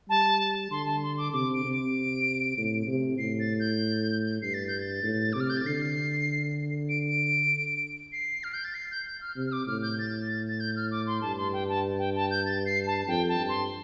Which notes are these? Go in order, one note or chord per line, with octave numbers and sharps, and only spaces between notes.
G3 A5
D3 C6
A5
C6
D6
C3 D6
D7
C3
D7
A2
C3
A2 C7
A6
G6
G2 C7
A6
G6
A6
A2
C3 D6
F6
G6
A6
D3 C7
D7
D7
C7
F6
G6
A6
C7
G6
G6
F6
C3
F6
D6
A2 F6
G6
A6
A6
G6
F6
D6
C6
G2 A5
C6
G5
A5
G5
A5
G6
A6
C7
A5
F2 G5
A5
G2
C6